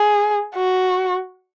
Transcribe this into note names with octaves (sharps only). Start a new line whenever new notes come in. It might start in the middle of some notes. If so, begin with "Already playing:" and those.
Already playing: G#4
F#4